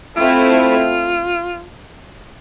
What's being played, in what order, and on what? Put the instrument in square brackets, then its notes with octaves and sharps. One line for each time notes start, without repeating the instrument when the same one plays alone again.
[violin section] A3 C4 E4 [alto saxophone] F4